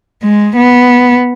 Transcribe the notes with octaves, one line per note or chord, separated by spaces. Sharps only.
G#3
B3